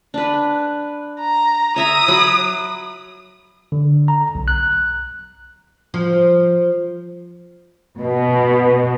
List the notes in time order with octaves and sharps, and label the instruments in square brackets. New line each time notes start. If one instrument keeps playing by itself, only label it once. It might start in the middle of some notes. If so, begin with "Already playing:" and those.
[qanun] D4 B4
[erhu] A#5
[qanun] C#5 E5 A#5 [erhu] D#6
[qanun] F#3 B5
[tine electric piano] D3
A#5
B1
F#6
[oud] F3
[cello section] B2